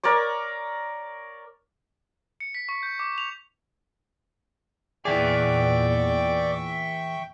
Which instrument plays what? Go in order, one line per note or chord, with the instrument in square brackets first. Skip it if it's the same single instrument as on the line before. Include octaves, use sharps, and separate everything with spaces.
[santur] A#4 C#5 D5 D6
[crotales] C#7
B6
C#6
G6
D6
F7
[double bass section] E2 A#2 [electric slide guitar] E3 G#4 [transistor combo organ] D5 [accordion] E5 G5 C#6